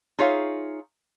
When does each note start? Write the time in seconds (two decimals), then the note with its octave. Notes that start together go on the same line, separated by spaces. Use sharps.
0.19 D#4 F4 G#4 C#5 E5 F5